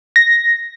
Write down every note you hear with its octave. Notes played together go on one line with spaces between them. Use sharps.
A#6